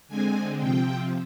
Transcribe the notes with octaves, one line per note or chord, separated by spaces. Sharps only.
D3 G#3 C4 G#5
C3 F3 C4 G5